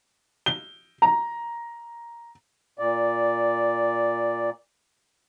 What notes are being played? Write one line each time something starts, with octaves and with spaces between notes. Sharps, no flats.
G7
A#5
A#2 D5